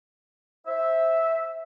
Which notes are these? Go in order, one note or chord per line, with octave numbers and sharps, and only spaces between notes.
C5 E5